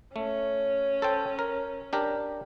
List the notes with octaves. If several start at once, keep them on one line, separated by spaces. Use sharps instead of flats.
A3 C#4
A4 C5 G5
A#4
D4 G4 A#4